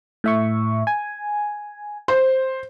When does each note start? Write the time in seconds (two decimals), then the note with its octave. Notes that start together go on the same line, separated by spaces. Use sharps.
0.24 A2 E5 C#6
0.87 G#5
2.08 C5